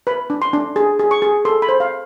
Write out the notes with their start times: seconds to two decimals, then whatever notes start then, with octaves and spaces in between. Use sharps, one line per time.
0.07 B4 B5
0.30 D4
0.42 C6
0.53 D4
0.76 G#4
0.99 G#4
1.11 C#6
1.22 G#4
1.45 A4 C6
1.62 B5
1.69 C5
1.80 F5